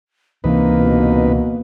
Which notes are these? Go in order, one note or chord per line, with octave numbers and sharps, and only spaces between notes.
C#2 C3 E3 A#3 D4 D#4 B4
B2